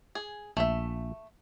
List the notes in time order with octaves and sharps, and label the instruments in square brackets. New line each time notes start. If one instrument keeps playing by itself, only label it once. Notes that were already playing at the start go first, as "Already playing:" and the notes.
[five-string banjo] G#4
[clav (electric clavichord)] A#1 [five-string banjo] A3 E5